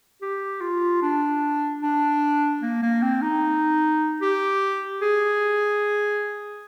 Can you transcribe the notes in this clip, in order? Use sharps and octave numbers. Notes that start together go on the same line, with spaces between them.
G4
F4
D4
D4
A#3
A#3
C4
D#4
G4
G#4